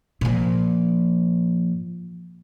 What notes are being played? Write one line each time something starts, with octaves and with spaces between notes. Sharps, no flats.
A#2 F3